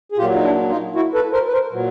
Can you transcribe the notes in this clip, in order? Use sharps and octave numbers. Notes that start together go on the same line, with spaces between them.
G#4
A#2 F#3 F4 G4
D#4
D4 E4
D#4 F4
E4 F#4
A4 B4
A#4 C5
B4
A#4 C5
A#2 F#3